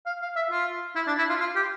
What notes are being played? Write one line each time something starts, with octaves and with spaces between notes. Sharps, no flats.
F5
F5
E5
F4
E4
D4
E4
F4
F4
G4